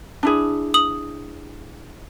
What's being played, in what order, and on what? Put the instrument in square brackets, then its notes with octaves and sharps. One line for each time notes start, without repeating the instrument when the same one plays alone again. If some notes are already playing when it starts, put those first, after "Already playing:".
[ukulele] D4 E4 G#4
[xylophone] D#6 F#7